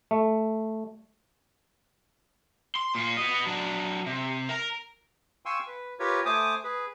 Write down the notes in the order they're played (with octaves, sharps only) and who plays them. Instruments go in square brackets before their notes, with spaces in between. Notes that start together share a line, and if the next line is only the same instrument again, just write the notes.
[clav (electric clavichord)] A3
[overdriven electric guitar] C6
A#2 F4
B3 D#5
F#3 D4
C3
A#4 A#5
[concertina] F5 G5 G#5 C6 C#6 E6
B4
F4 G4 A#4 B4 C#5
A3 C5 G#5 D6 D#6
G#4 B4